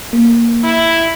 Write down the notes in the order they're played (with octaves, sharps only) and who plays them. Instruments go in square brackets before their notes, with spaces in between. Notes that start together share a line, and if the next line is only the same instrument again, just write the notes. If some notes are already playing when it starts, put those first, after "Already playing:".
[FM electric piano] A#3
[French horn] E4